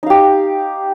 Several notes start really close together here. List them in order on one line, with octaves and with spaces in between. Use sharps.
D#4 F5 G4